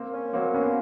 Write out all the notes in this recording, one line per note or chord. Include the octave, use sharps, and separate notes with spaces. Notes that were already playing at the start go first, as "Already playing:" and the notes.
Already playing: A#3 C4
C#4
F#3 A#3 C4
A#3 B3 C#4